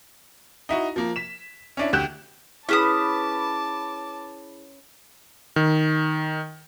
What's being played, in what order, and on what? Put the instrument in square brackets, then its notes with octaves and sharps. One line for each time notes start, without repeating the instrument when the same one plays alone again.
[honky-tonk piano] D#4 E4 F#4
F3 A#3
B6 E7
C#4 D4 E4
D2 G4 F#6 G6 E7
[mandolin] C#4 B4 D#6 [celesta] E4 G#4 E7 [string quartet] A5 D6
[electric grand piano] D#3